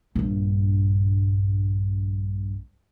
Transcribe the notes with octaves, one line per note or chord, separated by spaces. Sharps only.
A#1 G2